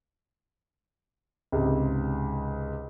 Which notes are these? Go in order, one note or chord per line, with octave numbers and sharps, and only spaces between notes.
C#2 G#2 C3